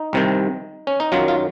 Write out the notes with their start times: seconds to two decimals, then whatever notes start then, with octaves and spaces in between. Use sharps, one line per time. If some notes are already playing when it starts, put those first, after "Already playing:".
Already playing: D#4
0.13 C2 C3 D#3
0.87 C#4
1.00 D#4
1.12 F#2 D#3 F#3 F4
1.28 F4